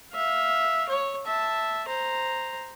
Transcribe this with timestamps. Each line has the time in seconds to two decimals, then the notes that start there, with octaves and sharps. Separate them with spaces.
0.13 E5 F5
0.88 C#5
1.26 E5 A5
1.87 C5 A#5